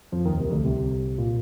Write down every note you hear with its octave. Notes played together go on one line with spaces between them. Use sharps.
F2 F3
D#2 D#3
C2 C3
D2 D3
C2 C3
A#2